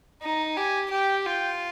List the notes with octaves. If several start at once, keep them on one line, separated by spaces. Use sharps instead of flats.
D#4 A#5
G4 G#5
G4 G5
F4 G5